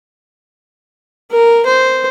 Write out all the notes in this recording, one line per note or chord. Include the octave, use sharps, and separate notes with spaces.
A#4
C5